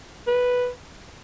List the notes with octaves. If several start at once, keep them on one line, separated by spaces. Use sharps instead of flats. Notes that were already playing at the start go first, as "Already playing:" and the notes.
B4